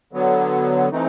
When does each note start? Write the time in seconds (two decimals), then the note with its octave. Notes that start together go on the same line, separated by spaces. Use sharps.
0.13 D3 F#3 B3
0.91 E3 A3 C4 D#4